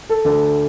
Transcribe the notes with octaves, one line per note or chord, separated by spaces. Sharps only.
A4
D2 D3